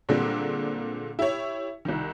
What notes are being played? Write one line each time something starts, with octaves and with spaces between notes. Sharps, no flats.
A#2 D3 G3 G#3 A#3 C4
E4 G4 C#5
C2 D#3